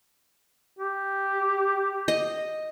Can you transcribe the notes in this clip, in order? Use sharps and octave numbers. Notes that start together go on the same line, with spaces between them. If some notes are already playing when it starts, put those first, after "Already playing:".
G4
D#5